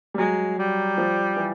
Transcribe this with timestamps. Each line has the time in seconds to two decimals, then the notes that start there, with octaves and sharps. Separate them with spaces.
0.14 G3
0.18 F#3 G#3
0.59 G3
0.98 F3
1.37 E3